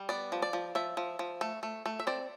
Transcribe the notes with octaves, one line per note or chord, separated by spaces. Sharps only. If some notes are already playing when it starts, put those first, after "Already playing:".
Already playing: G3
B3 D5
F3
D5
F3
F3 E5
F3
F3
A3
A3
A3
E5
C4 D5